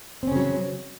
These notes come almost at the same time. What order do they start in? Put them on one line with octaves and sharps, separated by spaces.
C4 C#4 C#3 F#3